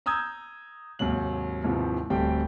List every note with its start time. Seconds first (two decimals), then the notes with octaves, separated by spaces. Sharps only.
0.06 A#5 D#6 E6 G6 G#6
0.99 D#2 G#2 C3 F#3 F#7
1.64 D#2 G#2 C3 E3 F3
2.10 D1 G3 A3 C4 G4 G5